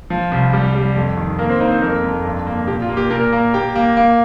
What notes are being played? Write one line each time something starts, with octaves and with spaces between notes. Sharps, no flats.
F3
C2
G3 G4
G3
F2
D#3
A#3 A#4
C4 C5
A#3 D#4 D#5
C4 C5
F2 A#3 A#4
F2
G2
A#3
A#2 G4
F4
A#3
G4
A#2 A#4 A#5
A#3
A#3 G4 G5
A#3
A#3